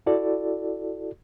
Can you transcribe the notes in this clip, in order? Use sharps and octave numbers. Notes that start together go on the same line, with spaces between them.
E4 F#4 A4 D5